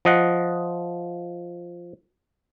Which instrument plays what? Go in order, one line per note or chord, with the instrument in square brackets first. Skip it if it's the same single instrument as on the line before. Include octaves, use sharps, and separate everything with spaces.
[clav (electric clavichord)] F3 D#5 F#5